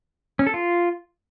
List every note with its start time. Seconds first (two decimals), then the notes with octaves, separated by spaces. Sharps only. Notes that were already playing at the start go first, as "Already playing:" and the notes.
0.39 C#4
0.47 A4
0.54 F4